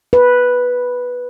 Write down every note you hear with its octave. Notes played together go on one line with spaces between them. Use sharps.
B4